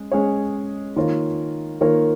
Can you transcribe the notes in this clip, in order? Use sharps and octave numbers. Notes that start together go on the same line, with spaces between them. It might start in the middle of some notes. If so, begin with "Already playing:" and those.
Already playing: G#3 C#4
G#3 C#4 G#4 C#5
D#3 A#3 F4 A#4 C#5
D#3 A#3 F4 A#4 C#5